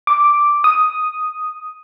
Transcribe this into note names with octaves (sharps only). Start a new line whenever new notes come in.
D6
D#6